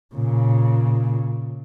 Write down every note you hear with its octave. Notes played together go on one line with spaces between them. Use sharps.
A#2 C#3